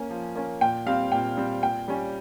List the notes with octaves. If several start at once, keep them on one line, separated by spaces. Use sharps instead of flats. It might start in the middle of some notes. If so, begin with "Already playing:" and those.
Already playing: A#3 C#4
F3
A#3 C#4
A#2 G5
G3 C4 F5
A#2 G5
G3 C4
A#2 G5
G3 C#4